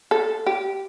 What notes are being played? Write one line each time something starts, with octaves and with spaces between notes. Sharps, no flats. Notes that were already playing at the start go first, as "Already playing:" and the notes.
A4
G4